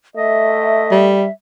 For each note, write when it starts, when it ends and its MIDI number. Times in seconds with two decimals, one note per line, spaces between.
0.16 1.16 57
0.16 1.18 75
0.16 1.31 76
0.92 1.26 55